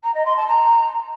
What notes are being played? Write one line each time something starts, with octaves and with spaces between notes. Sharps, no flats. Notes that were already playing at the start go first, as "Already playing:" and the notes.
A#5
D#5
C6
A5
A#5